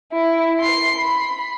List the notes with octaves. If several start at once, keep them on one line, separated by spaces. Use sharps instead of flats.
E4
C6 C7
B5